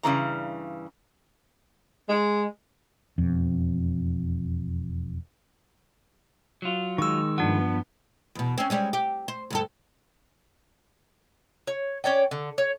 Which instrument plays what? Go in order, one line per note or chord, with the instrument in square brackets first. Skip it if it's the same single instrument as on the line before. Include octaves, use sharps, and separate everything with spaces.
[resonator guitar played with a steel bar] G2 C#3 E3 A#5
[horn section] G#3
[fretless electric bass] E1 F2
[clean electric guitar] F#3 F4
[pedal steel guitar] D#3 G#3 [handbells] C#6 E6
[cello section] G2 B3 [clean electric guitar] F3 [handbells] D4 F#5
[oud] E2 B2
C4 C#4
G3 G#3 C#4
G4
C5
D2 G2 A4
[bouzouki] C#5
C#4 C#5 D5 G5
D3
C#5